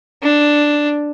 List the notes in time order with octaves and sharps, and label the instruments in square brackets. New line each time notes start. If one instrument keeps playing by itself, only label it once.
[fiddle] D4